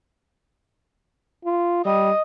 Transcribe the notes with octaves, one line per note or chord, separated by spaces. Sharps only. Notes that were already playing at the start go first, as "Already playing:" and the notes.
F4
G3 D#5